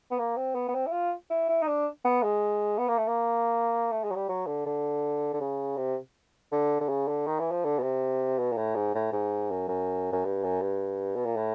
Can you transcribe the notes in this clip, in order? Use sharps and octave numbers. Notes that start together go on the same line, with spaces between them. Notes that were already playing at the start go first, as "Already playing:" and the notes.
B3
A#3
C4
B3
B3
C4
E4
F4
E4
E4
D#4
D4
B3
G#3
B3
A#3
A3
A#3
A3
G#3
F#3
G3
F#3
D3
D3
D3
C#3
C3
D3
D3
C#3
D3
D#3
E3
F3
D3
B2
C3
B2
A#2
A2
G#2
A2
G#2
F#2
F#2
F#2
G2
F#2
G2
B2
A#2
A2